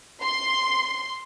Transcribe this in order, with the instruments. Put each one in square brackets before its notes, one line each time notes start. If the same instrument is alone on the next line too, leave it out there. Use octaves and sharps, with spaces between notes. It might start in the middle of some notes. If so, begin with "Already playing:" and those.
[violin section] C6